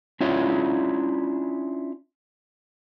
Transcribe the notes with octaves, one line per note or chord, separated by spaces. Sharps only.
C#4 D4 E4 F4 C#5